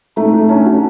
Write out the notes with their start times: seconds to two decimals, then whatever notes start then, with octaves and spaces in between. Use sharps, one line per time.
0.17 A3 D#4
0.33 A3
0.49 C#4 D4
0.66 F#4